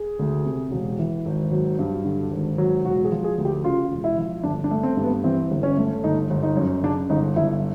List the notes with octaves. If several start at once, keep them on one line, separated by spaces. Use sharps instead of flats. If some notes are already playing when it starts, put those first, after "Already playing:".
Already playing: G#4
D2
C3
E1
E3
G#1
F#3
G2
D3
G#1
F#3
E1 F#4
G#4
F3
G#4
D2
G4
C#3 F4
E1
E4
F3
G1 D4
D4
A3
C4
G2
B3
E3 C4
G1
C#4
A3
G1 D#4
G1
D#4
F#2
C#3 D4
G1 D#4
G1 E4